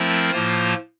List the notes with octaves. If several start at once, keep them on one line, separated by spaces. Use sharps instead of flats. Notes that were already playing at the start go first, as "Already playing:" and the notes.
Already playing: F3 A3 C4 E4 A#4
A2 F3 A#3 F4 C5